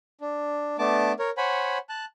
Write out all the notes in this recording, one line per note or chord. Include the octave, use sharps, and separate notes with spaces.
D4
A3 B3 D4 A5 D6
A#4 C#5
C5 C#5 F#5 G#5 B5
A5 F#6